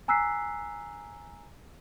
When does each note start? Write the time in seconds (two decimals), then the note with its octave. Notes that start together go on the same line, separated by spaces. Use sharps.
0.08 G#5 A#5 E6 F#6 B6 C7